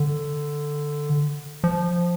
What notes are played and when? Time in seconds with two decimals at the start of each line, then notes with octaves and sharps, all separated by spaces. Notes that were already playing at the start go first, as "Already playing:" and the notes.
Already playing: D3
1.64 F3